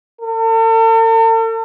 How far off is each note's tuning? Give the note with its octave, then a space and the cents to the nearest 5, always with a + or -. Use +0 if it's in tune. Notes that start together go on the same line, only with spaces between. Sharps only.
A4 +45